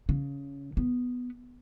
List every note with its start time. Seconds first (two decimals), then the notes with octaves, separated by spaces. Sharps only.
0.09 C#3
0.77 B3